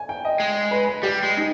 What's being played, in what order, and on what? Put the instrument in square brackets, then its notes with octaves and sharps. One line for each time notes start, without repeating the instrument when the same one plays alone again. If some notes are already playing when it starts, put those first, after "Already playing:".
Already playing: [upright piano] G#5
G5
D#5
[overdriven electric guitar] G#3
[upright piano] B4
B4
[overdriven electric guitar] G3 [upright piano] G4
[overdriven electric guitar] G#3
[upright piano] D#4